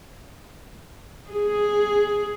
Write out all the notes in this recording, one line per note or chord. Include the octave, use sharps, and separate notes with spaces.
G#4